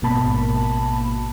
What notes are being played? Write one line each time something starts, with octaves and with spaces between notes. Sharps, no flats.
A1 G#2 B2 A#3 A5 B5